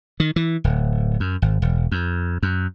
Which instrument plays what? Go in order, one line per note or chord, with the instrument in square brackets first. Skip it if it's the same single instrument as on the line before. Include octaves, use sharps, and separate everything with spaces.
[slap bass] D#3
E3
D1
F#2
G#1
E1
F2
F#2